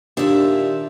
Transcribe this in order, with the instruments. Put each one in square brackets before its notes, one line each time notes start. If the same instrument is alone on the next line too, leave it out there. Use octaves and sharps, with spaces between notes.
[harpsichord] D#2 A#2 [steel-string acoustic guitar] D4 E5